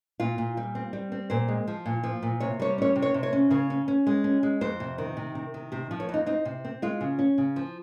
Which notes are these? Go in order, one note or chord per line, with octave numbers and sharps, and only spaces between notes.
A#2 F4
A#2
G3
C4
G3
C4
A#2 C5
G#3
F3
A#2
F3
A#2
C3 C#5
G3 C#5
C#4 C#5
C3
C#5
C3
C#5
C#4
C#3 C#5
C#4
C#4
G#3
C#4
G#3
F2 C5
C3
D#3
C3
C3
D#3
C3 G4
F3
C#5
F2 D#4
C4 D#4
C3
C4
G#3 F4
C#3
C#4
C#3
F3